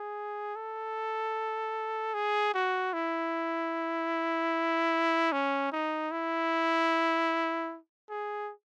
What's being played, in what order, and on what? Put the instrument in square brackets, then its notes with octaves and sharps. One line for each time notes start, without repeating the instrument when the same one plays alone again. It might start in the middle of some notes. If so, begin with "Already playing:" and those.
Already playing: [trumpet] G#4
A4
G#4
F#4
E4
C#4
D#4
E4
G#4